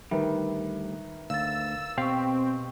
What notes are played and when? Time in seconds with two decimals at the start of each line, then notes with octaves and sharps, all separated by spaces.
0.11 D2 D#3 G3 B4 E5
1.30 D2 F5 E6 A6
1.98 B2 C4 G4 F5 G5 C#6